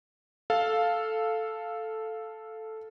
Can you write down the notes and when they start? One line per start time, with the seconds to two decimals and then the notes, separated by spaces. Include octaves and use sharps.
0.50 A4 F5